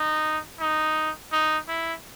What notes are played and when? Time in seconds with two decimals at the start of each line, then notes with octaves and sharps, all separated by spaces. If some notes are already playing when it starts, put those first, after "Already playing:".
Already playing: D#4
0.60 D#4
1.32 D#4
1.68 E4